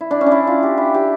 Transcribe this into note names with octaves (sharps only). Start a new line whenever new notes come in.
E4
D4
C#4
D4
E4
F4
G4
E4
G4